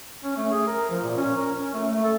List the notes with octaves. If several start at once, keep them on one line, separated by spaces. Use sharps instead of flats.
C#4
A3
G#4
A#4
F3
A#2
C#4
A#4
C#4
A3
A3
A4